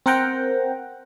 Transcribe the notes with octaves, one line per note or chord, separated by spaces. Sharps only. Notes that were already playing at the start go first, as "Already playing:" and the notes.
C4 A#4 F#5 G5 A#5